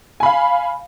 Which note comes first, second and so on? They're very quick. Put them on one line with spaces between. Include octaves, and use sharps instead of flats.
G#5 B5 F5